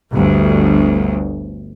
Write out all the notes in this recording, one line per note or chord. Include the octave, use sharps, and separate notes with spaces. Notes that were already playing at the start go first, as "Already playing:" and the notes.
G1 D2